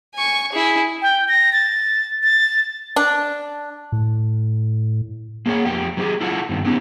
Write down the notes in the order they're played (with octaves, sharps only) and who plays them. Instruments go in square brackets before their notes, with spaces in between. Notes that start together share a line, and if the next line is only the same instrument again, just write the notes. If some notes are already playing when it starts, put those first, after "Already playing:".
[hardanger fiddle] G#5 C#6
E4 G#4
[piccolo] G5
A#6
A6
A6
[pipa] D4
[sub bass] A2
[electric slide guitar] A#3 G#4 A4 C#5 F#5
F2 A3 G4
F#3 A#3 C4 G4 G#4
E4 F4 A4 C5 F#5
G2 D#3
A3 B3 C#4 D#4 G4